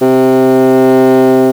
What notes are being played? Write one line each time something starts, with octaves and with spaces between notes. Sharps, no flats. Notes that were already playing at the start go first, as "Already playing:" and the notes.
C3